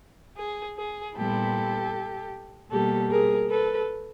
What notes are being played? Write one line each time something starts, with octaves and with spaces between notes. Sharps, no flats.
G#4
G#4
A#2 G3 B3 E4 G4 A4
B2 G3 A#3 G4 A4
G#4 A#4
A4 B4